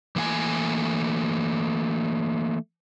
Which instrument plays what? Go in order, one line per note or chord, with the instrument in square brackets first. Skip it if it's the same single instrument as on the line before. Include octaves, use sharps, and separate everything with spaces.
[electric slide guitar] E3 A3 A#3 F#5 G#5